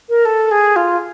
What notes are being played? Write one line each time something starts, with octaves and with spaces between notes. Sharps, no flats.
A#4
A4
G#4
F4